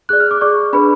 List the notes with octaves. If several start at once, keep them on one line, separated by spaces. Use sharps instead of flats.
G#4 D5 F#6
F6
D6
G#4 D5 C#6
D4 G#4 B4 B5